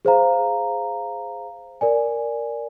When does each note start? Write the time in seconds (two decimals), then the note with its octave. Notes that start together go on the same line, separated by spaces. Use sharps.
0.05 G#4 C5 F5 A#5
1.81 A#4 D5 G#5